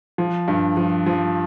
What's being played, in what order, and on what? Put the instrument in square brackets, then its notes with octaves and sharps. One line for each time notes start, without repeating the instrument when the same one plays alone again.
[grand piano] F3
G2
F3
F3